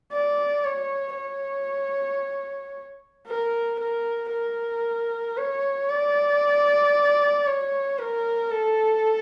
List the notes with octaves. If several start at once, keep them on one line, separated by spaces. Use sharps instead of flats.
D5
C#5
C#5
A#4
A#4
A#4
C#5
D5
C#5
A#4
A4